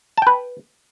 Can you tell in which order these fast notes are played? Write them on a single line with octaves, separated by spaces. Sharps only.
A5 G5 B4